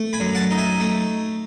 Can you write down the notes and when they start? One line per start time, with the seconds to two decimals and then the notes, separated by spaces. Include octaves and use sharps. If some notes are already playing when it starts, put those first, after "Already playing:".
Already playing: A3
0.13 G#5 B5
0.20 F#2
0.35 F#5 A5
0.51 D#4
0.57 E5 G#5
0.80 A3